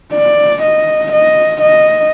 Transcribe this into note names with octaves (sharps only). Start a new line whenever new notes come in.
D5
D#5
D#5
D#5